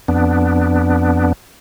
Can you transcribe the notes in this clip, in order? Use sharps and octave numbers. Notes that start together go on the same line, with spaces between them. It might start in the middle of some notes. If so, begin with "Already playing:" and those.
F2 B3 D4